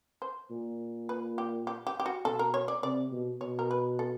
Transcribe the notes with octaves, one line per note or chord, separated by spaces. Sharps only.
C5
A#2
B4
G4
G4
G4
G4
F#4
B2 A4
A#4
C#5
D5
C3 D5
B2
B2 C#5
A#4
B4
A4